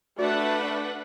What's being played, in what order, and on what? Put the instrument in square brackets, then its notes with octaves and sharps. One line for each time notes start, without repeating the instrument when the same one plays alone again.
[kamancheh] A3 [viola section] D4 B4 F#5 [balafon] F#4 [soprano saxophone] D5